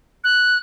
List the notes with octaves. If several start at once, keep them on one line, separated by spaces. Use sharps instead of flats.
F#6